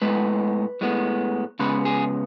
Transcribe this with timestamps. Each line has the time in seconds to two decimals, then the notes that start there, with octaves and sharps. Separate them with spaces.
0.02 A2 G#3 B3 B4
0.81 A2 G#3 B3
1.59 C#3 G#3 B3 B4
1.85 G#4